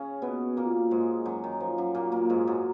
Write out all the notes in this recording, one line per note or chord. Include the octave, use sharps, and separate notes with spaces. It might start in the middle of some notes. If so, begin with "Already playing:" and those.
Already playing: C#3 C#4
B2 B3
A#2 A#3
G#2 G#3
F#2 F#3
D#3
F3
F#2 F#3
A#2 A#3
A#2 A#3
G#2 G#3
F#2 F#3